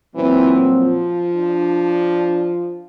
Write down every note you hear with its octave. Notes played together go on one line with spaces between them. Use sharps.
A#2 E3 F#3 C4
F3
D4